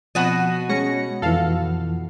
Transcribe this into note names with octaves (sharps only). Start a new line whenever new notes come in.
B2 F3 C4 F#4 D#5 D#7
G#3 C#4 G#4 C#5 A#6 C#7
F2 E3 F4 A4 F5